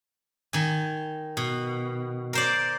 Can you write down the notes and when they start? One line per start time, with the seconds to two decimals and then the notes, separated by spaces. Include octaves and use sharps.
0.53 D#3 G#5
1.37 B2
2.33 A#4 C5 D5